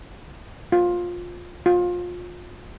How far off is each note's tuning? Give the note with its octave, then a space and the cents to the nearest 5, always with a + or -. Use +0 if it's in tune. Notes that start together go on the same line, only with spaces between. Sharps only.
F4 +15
F4 +25